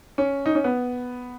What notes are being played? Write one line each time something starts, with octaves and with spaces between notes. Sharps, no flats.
C#4
D#4
C#4
B3